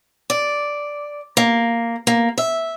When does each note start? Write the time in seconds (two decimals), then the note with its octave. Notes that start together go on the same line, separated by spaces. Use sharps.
0.30 D5
1.37 A#3
2.07 A#3
2.38 E5